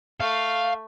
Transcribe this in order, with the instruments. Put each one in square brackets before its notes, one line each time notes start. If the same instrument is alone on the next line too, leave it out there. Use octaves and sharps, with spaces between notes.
[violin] A3 [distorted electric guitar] F5